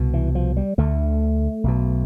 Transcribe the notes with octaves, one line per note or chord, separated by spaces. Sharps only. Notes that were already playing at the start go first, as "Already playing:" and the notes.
Already playing: C2 B2
E3
F3
G3
D2 D3 A3
B1 B2